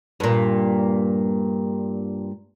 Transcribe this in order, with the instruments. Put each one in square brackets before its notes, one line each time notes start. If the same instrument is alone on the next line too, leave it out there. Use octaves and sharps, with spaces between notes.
[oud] G2 A#2